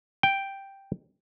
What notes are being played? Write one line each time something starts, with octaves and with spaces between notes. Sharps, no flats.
G5